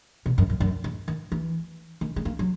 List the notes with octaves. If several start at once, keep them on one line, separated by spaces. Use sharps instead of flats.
B2
F#2
F#2
F#2
G#2
D#3
E3
D#3
G#3
A#3
F#3